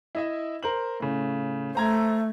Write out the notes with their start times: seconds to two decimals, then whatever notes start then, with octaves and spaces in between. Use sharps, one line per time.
0.15 E4 D#5 E5
0.63 A#4 C5 F#7
1.00 A2 C#3
1.75 A3 C5 A#5 G#6